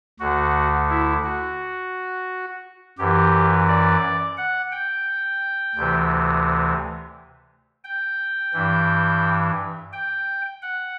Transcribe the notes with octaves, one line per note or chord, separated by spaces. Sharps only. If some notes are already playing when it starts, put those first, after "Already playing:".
D2 D3 F#4
E4
F#4
F#2 E3 G4
D5
F#5
G5
D2 C3 E3
G5
G2 E3
G5
F#5